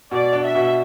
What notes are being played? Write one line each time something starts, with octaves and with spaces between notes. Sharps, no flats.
B2 D5
D4
E5
B2